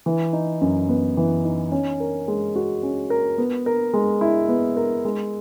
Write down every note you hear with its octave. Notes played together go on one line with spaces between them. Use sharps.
E3
D#4
F#2
B3
E3
D#4
C#4
A#4
G#3
F#4
C#4
A#4
B3
A#4
G#3
E4
B3
A#4
G#3